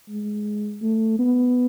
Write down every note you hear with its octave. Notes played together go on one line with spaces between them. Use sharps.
G#3
A3
B3